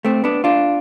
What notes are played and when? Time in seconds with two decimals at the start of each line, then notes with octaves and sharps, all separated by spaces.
0.05 A3 C4
0.24 B3 D4
0.44 D4 F4